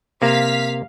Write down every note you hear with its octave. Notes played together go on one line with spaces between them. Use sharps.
C3 A#3 F5 B6